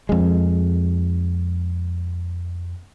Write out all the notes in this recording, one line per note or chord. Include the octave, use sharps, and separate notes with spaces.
F2 G#3